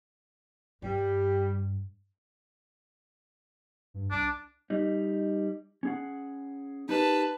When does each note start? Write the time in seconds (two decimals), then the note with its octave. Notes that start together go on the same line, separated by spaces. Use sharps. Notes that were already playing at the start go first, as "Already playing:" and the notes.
0.82 G2 G3
3.94 G2
4.11 C2 D4
4.70 G3 D#4
5.83 C#4 G#4 F#5
6.89 D#4 G4 A#4 B4 A5